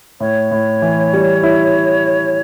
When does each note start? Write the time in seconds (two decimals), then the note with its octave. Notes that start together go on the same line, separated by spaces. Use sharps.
0.20 A2 C#5
0.51 A2
0.82 E3
1.13 G3
1.43 E4